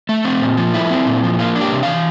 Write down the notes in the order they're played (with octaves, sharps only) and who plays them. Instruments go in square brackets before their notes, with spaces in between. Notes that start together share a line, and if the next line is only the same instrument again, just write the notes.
[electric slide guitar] A3
C4
A#2
F3
A3 E4
C4
A#2
F3
A#3 F4
D4
G4
C3
E3 F5